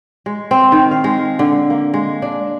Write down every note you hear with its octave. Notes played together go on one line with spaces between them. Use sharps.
G#3
C4
D#3
F5
G#3
D3
A#3
G#3
D4